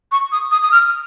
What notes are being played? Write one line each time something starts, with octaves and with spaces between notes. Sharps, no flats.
C#6
D#6
D#6
D#6
F6